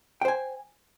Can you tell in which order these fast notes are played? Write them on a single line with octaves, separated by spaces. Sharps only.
G5 C5 G#5